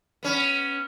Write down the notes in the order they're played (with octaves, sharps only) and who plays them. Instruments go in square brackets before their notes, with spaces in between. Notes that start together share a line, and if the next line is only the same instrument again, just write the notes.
[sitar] B3 C#4